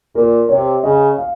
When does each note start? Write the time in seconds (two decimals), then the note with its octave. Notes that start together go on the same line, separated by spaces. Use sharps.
0.15 A#2 A#4
0.49 C3 C#5
0.84 C#3 D#5
1.18 F5